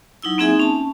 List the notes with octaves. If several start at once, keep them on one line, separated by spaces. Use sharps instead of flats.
F#3 D#4 E4 E6
A#3 C4 D#4 G#4 E5 G#5
C#4 A5